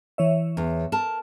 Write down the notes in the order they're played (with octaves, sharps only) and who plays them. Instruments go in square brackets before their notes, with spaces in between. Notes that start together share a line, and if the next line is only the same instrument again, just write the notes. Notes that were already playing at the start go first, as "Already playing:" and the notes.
[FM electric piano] E3 C#5 E5
[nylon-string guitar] E2
A#4 A5